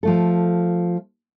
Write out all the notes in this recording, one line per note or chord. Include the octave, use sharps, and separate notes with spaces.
F3 A3 A4